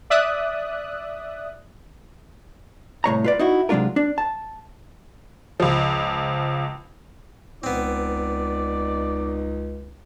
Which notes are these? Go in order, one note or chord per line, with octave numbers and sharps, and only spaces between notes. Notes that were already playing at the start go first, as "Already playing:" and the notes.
D5 E5 D#6 F#6
C2 A2 C#5 A#5
F4 B4 D5
D#4 E4 F#4
C3 F#3 G#3 D4 F4 A#4
D4
A5
C#2 F3
C#2 B3 C4 D#4 D5